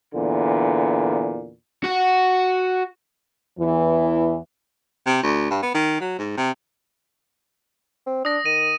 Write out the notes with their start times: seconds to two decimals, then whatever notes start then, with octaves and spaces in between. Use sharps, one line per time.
0.14 E2 A#2 D3
1.84 F#4 F#5
3.59 E2 E3
5.07 C3
5.23 D2
5.51 G2
5.63 B3
5.74 D#3
6.01 F#3
6.19 G#2
6.37 C3
8.06 C4
8.25 D4 D#6 A#6
8.45 D#3 D#7